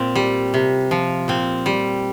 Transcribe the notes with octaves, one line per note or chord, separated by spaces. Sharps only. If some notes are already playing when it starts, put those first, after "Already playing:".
Already playing: A#2 C4
G3
C3
F3
A#2 C4
G3